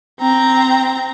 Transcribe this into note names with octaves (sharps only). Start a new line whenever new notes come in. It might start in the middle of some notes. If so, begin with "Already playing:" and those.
C4 A#5